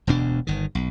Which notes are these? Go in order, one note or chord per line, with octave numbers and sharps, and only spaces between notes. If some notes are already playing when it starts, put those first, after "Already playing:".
E1 D2 B2 D4
G1 D#3
B1